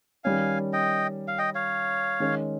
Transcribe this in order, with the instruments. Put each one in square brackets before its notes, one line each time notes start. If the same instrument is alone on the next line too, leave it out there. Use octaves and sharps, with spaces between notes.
[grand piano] D#3 G3 C#4 [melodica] F5 G#5
[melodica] D#5 G5
F5
D#5 G5
C#5 F5
[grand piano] D#3 G#3 C#4